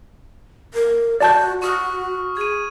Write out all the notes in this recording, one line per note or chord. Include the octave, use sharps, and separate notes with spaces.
A#4
F#4 D5 A5 G6
F#4 C#6 D#6 F6
G#4 G#6 D#7